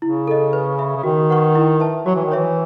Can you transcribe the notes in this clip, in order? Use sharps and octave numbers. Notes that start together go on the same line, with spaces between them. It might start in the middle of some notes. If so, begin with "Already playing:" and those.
C#3 E4
A4 D#5
B4
E5 B5
C#3
D#3 F#4
B4 F#5 C#6
E4
B4 E5 A5
F#3 F#4
E3
D#3
E3 C#5 E5